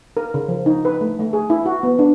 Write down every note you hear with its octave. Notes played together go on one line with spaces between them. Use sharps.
A#4
C#3
F3
D#4
B4
A3
A3
G#4
E4
F#4
B3
D4